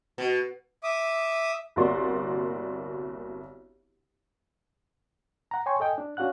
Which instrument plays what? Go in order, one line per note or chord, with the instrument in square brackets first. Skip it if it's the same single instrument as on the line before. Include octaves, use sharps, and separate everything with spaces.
[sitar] B2
[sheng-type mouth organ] E5 D6 D#6
[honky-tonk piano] G1 C2 A#3 F#4 D5 C6
[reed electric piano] F#5 A#5
C#5 G5 G#5 C6 C#6
A4 D#5 G5 G#5
D4
C#4 D4 F#4 F5 F#5 F#6